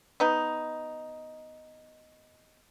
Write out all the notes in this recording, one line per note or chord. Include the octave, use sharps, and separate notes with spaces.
B3 D#4